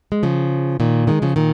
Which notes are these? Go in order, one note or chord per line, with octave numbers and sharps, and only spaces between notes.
G#3
C#3 F3
A#2 D#3
D#3 G#3
C#3 F3
A#2 D#3